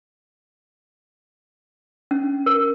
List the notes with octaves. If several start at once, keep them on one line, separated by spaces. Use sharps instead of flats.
C#4
A#4